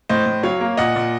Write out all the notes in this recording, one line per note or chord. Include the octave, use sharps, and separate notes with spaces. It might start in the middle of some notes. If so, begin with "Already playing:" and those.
A2 C5 D#5
A2
F#3 C#5 F5
A#3
A#2 D#5 F#5
A#2